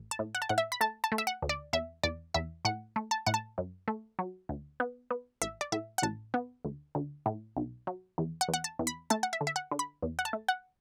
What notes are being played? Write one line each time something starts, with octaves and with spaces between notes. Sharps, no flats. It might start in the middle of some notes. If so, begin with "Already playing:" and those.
Already playing: A1
A5
A2
F#5
A5
A2 F#5
E5
B5
A3 A5
A5
A3
E5
F#5
D2
D5
E2 E5
E2 D5
E2 E5
A2 F#5
A3
A5
A2 F#5
A5
F#2
A3
F#3
D2
B3
B3
A1 E5
D5
A2 E5
F#5
A1 A5
B3
D2
D2
A2
B1
F#3
E2
F#5
E2
F#5
A5
E2
B5
A3 A5
F#5
E5
D3
E5
F#5
D3
B5
E2
F#5
A5
A3
F#5